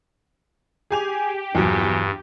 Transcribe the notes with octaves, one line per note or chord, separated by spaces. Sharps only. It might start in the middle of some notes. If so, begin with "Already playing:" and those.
G4 G#4 G#5 F7
A#1 E2 G2 F3 F#3